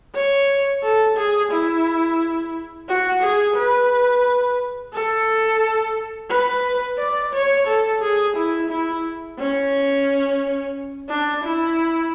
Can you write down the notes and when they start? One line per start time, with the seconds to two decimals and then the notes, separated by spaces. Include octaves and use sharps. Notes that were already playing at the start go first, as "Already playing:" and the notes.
0.14 C#5
0.83 A4
1.17 G#4
1.52 E4
2.89 F#4
3.23 G#4
3.57 B4
4.93 A4
6.30 B4
6.98 D5
7.33 C#5
7.67 A4
8.02 G#4
8.36 E4
8.70 E4
9.39 C#4
11.09 D4
11.44 E4